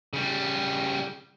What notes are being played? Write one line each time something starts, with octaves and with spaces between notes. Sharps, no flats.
C#3 G3